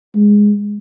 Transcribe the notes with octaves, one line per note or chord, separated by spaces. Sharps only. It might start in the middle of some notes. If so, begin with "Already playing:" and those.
G#3